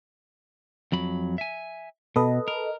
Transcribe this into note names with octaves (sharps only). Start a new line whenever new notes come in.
F2 F#3 B5
E5 G#5
B2 A4 B4 D#5
A#4